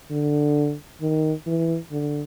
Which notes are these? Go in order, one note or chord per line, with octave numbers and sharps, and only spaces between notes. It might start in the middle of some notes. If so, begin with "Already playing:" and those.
D3
D#3
E3
D3